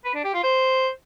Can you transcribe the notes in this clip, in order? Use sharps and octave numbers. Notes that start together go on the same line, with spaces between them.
B4
D4
G4
F4
C5